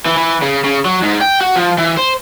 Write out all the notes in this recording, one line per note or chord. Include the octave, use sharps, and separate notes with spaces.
E3
E3
C#3
C#3
F#3
G#2
G5
F#4
F3
E3
C5